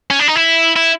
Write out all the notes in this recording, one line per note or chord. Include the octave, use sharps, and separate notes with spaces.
C#4
D4
D#4
E4
E4